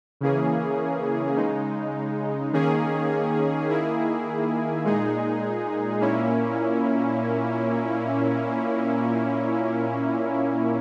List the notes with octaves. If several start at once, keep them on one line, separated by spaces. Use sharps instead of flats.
C#3 E3 A#3 C#4 G#4
C#3 G#3 D#4
D#3 A#3 C#4 G#4
D#3 A#3 E4 G#4
A#2 G#3 D#4 G#4
A#2 A#3 C#4 E4